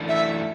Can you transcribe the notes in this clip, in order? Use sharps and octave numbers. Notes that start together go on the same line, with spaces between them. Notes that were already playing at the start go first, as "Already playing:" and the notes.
Already playing: E3 A3 D4
E5